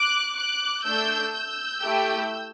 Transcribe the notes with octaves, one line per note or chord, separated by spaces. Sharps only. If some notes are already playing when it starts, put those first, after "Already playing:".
Already playing: D6 F#6
D6 F#6
A3 D4 A4 E6 G6
E6 G6
A3 E4 G4